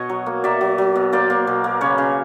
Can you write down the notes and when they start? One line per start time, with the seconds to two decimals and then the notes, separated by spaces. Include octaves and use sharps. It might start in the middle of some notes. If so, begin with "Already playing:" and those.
Already playing: B2 C#5 D#5
0.10 F#3
0.26 A#3
0.44 F#3 D5 E5
0.61 F#3
0.78 F#3
0.96 B2
1.12 A#3 C5 D5
1.30 A#3
1.47 B2
1.64 A#3
1.81 C#3 B4 C#5
1.98 C#3